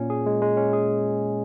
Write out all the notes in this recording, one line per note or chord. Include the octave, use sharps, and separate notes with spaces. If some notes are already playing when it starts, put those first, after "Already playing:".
Already playing: A#2 C#4
G#4
G#3
G#3
C#4
G#4